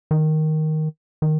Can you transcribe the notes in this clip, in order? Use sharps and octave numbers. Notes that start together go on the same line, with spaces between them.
D#3
D#3